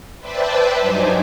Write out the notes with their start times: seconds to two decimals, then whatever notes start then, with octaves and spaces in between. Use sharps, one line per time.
0.19 B4 C5 D5 E5 G5 A5
0.81 G2 F#3 D#4 C5 G#5 D6